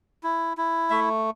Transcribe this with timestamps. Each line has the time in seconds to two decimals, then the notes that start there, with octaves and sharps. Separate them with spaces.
0.23 E4
0.57 E4
0.90 A3 E5